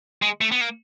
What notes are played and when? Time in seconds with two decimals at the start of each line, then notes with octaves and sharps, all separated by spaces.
0.22 G#3
0.41 A3
0.52 B3
0.61 A#3